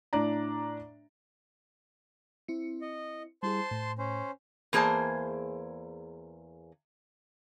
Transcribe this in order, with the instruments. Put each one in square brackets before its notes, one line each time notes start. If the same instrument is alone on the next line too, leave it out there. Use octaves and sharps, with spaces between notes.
[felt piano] A2 D4 D5 A#5
[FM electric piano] C4 E4 C#7
[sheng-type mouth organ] D#5
[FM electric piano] G3 E4 G#4 [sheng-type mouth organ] C5 A5 C6
[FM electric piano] A2
[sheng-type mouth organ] C#4 C5
[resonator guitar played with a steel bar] E2 A#3 G#4 C5 A5